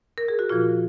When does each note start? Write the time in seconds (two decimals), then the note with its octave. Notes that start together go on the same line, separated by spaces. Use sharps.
0.18 A#4
0.28 G#4
0.39 F#4
0.49 A#2 F3 F4